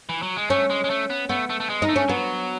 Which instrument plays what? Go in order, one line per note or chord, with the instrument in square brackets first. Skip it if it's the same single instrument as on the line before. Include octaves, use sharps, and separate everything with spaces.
[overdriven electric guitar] E3
F#3
G#3
[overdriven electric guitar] A3 [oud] C#4
[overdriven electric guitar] G#3
G#3
A3
B3
[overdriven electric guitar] A3 [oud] B3
[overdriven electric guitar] A3
A3
G#3
[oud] D#4
[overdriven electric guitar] A3
[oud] C#4
[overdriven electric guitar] F#3 [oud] B3